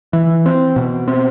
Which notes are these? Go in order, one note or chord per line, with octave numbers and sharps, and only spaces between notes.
E3
C4
B2
C4